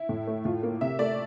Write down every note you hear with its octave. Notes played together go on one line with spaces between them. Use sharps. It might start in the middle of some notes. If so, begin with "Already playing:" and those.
Already playing: E4
A2
A3
A2 F4
A#3
C3 E5
A3 D5